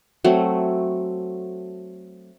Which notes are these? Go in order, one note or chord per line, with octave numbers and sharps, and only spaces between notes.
F#3 A3 C4